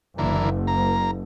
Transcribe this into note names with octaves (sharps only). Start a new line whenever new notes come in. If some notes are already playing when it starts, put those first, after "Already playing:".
F#1 D3 E3 A#3
A#3 A#5